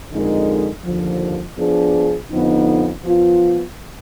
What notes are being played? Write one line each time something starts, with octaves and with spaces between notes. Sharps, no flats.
F2 D3 G#3 D#4 A#4
D#2 D3 F3
F3 B3 D4 G#4
F2 D3 F3 B3 D#4
F3 B3 F4